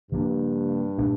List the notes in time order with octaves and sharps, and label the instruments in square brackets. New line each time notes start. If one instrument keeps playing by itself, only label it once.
[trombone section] G2 [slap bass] C#3 F3 A#3 D4
[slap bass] A#2 A3 D4